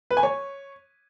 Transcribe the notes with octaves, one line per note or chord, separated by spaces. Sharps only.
B4
G#5
C#5